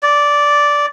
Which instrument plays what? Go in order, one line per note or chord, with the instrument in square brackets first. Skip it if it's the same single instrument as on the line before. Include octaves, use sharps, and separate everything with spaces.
[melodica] D5